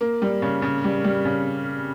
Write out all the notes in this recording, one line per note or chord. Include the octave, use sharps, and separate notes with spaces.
A#3
G3
C#3
C#3
G3
G3
C#3